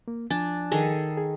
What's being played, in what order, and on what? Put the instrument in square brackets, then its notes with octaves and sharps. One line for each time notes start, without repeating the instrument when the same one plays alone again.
[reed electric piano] A#3
[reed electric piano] F3 G#5 A6 [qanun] D4
[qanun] D#3 G#4 A4
[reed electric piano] G#4